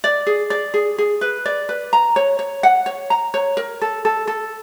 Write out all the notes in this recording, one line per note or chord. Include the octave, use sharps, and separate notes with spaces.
D5
G#4
D5
G#4
G#4
B4
D5
B4
A#5
C#5
C#5
F#5
C#5
A#5
C#5
A#4
A4
A4
A4